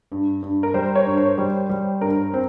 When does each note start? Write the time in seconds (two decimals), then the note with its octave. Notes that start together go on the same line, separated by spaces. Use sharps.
0.12 G2
0.42 G2
0.63 A#4
0.74 G3 C5
0.95 C#5
1.06 G2
1.17 C5
1.38 G3
1.69 G3
2.01 G2 A#4
2.34 C4